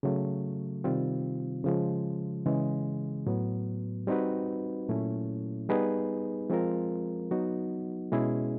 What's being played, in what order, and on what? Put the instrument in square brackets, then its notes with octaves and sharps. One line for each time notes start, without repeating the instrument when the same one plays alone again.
[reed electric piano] C#3 F#3 A3
C3 D#3 G3 C4 F4
C#3 F3 G#3
C#3 E3 G#3
A2 F#3 B3
G3 C4 D#4 F#4 B4
A#2 F#3 A3 C#4 E4
G3 B3 D#4 G#4 B4
F3 G#3 C4 F4 A#4
F#3 B3 D#4 F#4
B2 G#3 C#4 E4 G#4